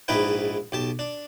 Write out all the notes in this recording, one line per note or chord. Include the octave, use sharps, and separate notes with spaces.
A#1 G#2 D#4 E4 B4 G5
B1 G4 A5
D4